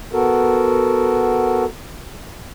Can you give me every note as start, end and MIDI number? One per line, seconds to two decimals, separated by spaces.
0.13 1.65 59
0.13 1.65 66
0.13 1.65 69
0.13 1.65 70